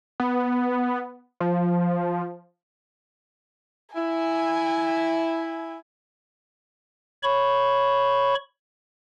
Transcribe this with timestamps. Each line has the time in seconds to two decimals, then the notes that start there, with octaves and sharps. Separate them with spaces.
0.20 B3
1.40 F3
3.96 E4 G#5
7.23 C#5 B5 C#6